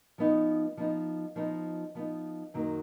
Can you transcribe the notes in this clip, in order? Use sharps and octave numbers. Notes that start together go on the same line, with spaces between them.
F3 B3 D#4
F3 B3 D#4
F3 B3 D#4
F3 B3 D#4
F#2 D#3 F#3 A#3 D#4